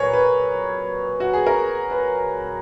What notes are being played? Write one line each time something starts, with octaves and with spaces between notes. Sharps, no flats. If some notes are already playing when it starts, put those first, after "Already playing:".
Already playing: A#2 F#3 G#4 A#4 B4 C#5
B4
F#4
G#4
A#4
B4